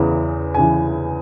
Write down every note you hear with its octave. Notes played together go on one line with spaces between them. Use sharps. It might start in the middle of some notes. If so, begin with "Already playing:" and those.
Already playing: E2 C#3 E3
C#3 E3 G#5